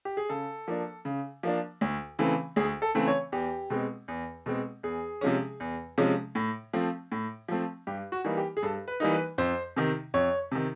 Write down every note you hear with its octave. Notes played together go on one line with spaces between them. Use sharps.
G4
G#4
C#3 A4
F3 A#3 D4
C#3
F3 A#3 D4
D2
C#3 E3 A3 C4
D2 G#4
A4
C#3 E3 A3 C4
C#5
E2 G4
B2 G#3 C4
E2
B2 G#3 C4
E2 G#4
C3 F3 G#3 C#4
E2
C3 F3 G#3 C#4
A2
F3 A3 C4
A2
F3 A3 C4
G2 G4
F#4
E3 G3 A#3 D#4
G4
G#4
G2 A4
B4
E3 G3 A#3 D#4
B4
F2 C5
C3 D#3
F2 C#5
C3 D#3